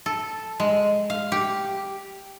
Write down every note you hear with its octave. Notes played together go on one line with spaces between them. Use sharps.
A4
G#3
F5
G4